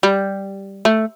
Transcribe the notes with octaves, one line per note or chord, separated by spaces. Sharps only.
G3
A3